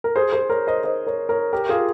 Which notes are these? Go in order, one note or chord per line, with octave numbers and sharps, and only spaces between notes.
A#4
G#4 C5
G#4 C5
A#4 C#5
C5 D#5
C5 D#5
A#4 C#5
A#4 C#5
G4 A#4
F4 G#4